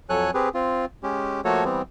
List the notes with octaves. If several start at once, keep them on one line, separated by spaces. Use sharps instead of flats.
F2 F#3 A4 C#5 G#5 F#6
C4 G4 G#4 B4
C4 F4
G#3 C#4 G4
F3 A3 A#3 F#4 A4 C#5
E3 G3 B3 C4